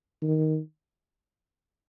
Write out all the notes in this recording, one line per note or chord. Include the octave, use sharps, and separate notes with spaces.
D#3